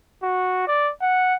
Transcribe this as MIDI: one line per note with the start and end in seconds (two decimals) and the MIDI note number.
0.23 0.63 66
0.67 0.91 74
1.01 1.35 78